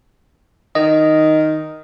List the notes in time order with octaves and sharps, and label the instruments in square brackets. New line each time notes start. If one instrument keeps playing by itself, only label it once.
[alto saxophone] D#3 [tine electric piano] D#5